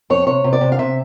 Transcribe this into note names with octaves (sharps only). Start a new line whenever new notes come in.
F2 C#5
C3 C#5
C3
D5
C3
F5
C3 E5